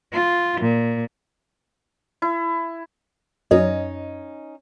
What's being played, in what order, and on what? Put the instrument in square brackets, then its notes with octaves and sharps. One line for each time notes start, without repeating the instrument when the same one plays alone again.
[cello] F4
A#2
[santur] E4
[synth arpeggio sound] F#2 [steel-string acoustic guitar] C#4 D#4 [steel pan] D#5